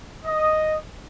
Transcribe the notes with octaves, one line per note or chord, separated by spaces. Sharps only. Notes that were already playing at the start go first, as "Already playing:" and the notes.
D#5